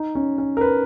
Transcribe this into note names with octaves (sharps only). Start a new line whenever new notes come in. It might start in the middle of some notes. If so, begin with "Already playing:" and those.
Already playing: D#4
C#4
C#4
A#4
B4